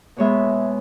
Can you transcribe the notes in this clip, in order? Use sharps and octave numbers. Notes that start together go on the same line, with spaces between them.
B2 G#3 B3 C#5 E5